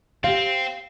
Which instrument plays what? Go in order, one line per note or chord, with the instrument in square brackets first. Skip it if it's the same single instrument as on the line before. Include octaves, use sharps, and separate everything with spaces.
[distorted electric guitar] C4 [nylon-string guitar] G4 F5